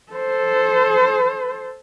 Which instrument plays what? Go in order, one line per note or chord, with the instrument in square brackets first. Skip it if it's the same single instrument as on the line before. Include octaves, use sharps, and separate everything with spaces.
[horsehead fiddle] A4 C5